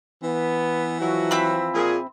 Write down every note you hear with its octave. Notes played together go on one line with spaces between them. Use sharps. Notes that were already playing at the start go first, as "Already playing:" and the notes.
E3 B3
F3 F#3 E4 F#4
C4 E5 B5
A#2 G#4